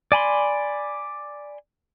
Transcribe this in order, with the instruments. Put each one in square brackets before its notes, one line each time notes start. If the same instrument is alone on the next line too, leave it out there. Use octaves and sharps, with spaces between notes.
[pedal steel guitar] D5 G#5 B5 C6